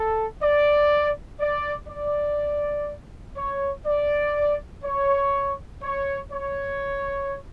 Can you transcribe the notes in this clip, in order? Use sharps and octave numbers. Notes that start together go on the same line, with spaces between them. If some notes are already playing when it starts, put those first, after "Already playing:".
Already playing: A4
D5
D5
D5
C#5
D5
C#5
C#5
C#5